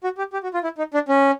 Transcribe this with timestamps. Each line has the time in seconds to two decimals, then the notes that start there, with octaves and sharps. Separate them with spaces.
0.04 F#4
0.18 G4
0.33 G4
0.43 F#4
0.54 F4
0.64 E4
0.78 D#4
0.94 D4
1.08 C#4